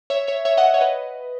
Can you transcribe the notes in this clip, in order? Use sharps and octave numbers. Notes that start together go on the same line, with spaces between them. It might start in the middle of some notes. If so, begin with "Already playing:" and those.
C#5 E5
C#5 E5
C#5 E5
D#5 F#5
C#5
B4 D#5